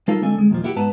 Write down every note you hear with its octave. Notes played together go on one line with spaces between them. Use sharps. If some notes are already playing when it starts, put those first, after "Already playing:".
G3 D#4 F4 A4 A#4 F5
D3 G#3 C4 A4 G#5
D2 G#3
D#2 A#2 F3
A#3 E4 F#4 G4
G#2 B3 B4 A5 A#5